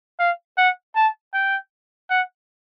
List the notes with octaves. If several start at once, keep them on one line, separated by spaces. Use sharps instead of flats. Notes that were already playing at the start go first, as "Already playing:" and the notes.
F5
F#5
A5
G5
F#5